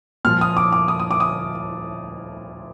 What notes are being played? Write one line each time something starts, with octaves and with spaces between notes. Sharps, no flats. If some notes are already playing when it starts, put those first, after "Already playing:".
A#2 F3 F6
D#6
D6
D6
D#6
D#6
D6
D#6